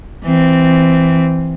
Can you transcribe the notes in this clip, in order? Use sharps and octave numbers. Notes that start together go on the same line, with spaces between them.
E3 C4